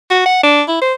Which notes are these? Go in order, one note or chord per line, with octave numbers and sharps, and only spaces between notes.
F#4
F#5
D4
E4
C5